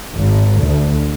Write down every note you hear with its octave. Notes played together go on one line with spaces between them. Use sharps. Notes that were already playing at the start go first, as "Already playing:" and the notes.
G#1
D2